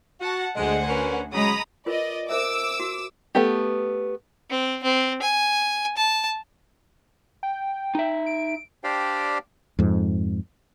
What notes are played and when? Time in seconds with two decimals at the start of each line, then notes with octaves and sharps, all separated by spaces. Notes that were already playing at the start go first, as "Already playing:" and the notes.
0.21 F#4 F#5 A5
0.56 D2 G#3 C5 F#5 G#5
0.89 C#4 A#4 B4
1.33 C#3 F#3 G#3 A#5 B5 D#6
1.86 F4 A#4 B4 D5 D#5
2.29 A#4 C5 E5 D6 E6
2.80 F#4
3.35 A3 B3 G4
4.50 C4
4.83 C4
5.22 G#5
5.97 A5
7.43 G5
7.95 D#4 E5
8.26 D7
8.84 D4 G4 C5 D5 F5 G5
9.79 F2 G#2